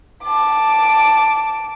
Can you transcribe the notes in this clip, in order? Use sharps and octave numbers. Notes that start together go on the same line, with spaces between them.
A5 D6